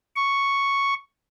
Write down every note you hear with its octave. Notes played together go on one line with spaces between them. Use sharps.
C#6